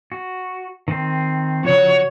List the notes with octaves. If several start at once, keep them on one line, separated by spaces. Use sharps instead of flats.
F#4
D#3 C4
C#3 F3 F#4 C#5